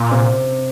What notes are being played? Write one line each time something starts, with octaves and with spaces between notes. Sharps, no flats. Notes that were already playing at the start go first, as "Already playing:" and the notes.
Already playing: A#2
C3 C4